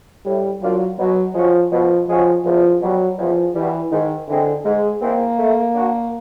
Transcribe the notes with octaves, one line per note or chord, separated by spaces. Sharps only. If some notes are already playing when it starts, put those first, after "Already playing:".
A2 G3
F3 F#3 A#3 D4 F4
B2 F#3
F3 G#3 C#4 F#4
B2 F3
F3 G#3 C#4 F#4
E2 F3
B2 F#3 G3
E2 F3
B2 E3 G3
G#2 D#3
D3 E3 G#3 C4
G#2 G#3
E3 G#3 A#3 C4
A3
D4 F#4